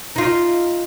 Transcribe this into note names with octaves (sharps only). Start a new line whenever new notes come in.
D#4 F4